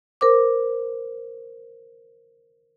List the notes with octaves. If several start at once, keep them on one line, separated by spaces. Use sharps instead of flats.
A#4 C5 D6